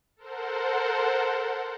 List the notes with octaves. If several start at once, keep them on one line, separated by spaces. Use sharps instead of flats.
A4 A#4 C5 F#5